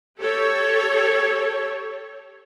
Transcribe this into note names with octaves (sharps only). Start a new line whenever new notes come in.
G4 A4 C#5